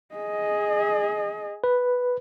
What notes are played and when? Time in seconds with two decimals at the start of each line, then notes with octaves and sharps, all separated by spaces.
0.15 G#4 D#5
1.64 B4